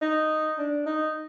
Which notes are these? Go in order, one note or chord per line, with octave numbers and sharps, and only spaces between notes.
D#4
D4
D#4